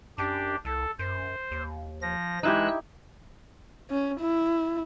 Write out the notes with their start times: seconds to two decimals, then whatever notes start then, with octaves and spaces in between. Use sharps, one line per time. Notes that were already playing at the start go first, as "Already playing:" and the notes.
0.18 F#2 D4 G4
0.65 C2 A4
0.99 F#2 C5
1.51 D#2
2.02 F3 A#6
2.43 E3 G#3 D#4 E4 G4 E6 F#6
3.90 C#4
4.20 E4